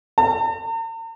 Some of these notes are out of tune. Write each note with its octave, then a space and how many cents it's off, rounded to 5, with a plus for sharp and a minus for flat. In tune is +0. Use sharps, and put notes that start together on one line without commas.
A#5 -45